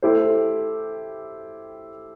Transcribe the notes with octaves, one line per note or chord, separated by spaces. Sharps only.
A3 E4 G4 C5